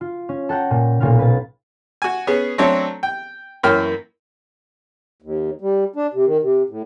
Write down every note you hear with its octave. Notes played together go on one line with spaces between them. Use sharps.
F4
C#4
A4 F#5 G5 A#5
A#2
B1 A#2 F4 A#4 F5
B4 A6
F#4 G#5
B3 C#4 G#4
F#3 A3 C4 D4 A4 C#5
G5
F#2 E3 A#3 C#4 G5 F6
D#2
G3
D4
C3
D#3
C3
A2